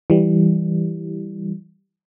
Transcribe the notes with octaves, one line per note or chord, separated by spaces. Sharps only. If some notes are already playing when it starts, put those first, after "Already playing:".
E3 G3